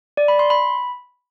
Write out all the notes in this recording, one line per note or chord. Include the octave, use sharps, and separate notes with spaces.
D5
B5
C6
B5